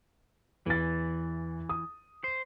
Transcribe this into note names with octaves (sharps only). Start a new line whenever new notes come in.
E2 E3 A6
D#6
C5